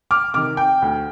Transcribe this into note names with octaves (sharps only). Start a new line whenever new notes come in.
D6 F6
C3 D#3 D6 F6
G5
D2